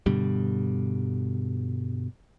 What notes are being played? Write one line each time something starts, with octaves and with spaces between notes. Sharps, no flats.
G2 B2 D3 G3